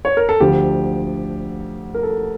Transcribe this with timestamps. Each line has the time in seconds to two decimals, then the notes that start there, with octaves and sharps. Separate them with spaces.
0.05 C#5
0.17 A#4
0.29 A4
0.40 D2 D3 F3 G4
1.95 A#4
2.03 A4